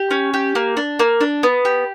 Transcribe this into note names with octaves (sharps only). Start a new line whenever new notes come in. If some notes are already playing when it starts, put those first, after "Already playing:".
Already playing: G4
C#4
G4
A#3
D4
A#3
D4
B3
G4